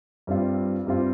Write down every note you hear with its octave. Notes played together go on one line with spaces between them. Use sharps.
G2 G3 C4 F4
G2 G3 C4 F4